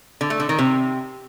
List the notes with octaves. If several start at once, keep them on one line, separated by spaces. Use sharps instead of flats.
D3
A3
D3
D#3
C3